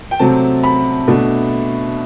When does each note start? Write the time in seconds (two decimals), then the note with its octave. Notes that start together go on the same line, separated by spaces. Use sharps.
0.11 G5
0.19 C3 F#3 A3 C4 A5
0.64 B5
1.08 B2 A3 D4